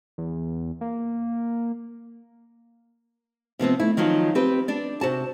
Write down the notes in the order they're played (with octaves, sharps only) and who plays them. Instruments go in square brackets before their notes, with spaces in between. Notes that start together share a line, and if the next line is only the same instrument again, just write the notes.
[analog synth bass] E2
A#3
[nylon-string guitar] C3 F3 B3 C4
A3 E4
D#3 F3 F#3 F4
C4 G4 B4
D4 D5
C3 F#4 A5